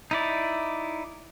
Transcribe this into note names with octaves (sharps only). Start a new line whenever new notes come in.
D#4 E4 D5